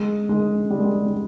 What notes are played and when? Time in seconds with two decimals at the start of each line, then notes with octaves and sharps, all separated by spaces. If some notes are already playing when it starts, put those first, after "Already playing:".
Already playing: G#3
0.29 G#3
0.70 G3
0.79 G#3
0.85 G3
1.07 G3